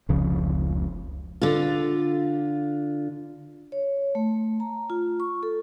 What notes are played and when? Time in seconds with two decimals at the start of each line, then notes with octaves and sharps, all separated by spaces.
0.09 F1 C#2 C#3 F3
1.42 D3 F4
3.72 C#5
4.15 A3
4.60 A#5
4.90 F4
5.20 C#6
5.43 A4